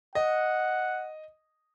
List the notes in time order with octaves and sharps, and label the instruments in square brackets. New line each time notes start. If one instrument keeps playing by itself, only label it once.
[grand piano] D#5 [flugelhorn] F#5